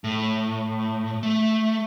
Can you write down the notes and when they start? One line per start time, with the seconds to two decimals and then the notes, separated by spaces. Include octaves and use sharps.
0.04 A2
1.23 A3